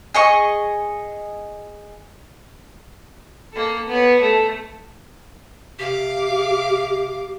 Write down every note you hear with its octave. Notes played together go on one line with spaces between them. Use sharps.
G#4 D#5 C#6
A#3 A4
B3 C#5
A3
C3 G4 F5 D6